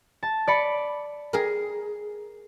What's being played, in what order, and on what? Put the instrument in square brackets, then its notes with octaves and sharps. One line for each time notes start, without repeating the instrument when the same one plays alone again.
[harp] A5
D5 B5 C#7
[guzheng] G#4 A#4